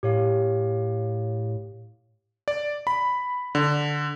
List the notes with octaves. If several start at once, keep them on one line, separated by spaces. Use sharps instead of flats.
A2 G4 C#5 F5
D5
B5
D3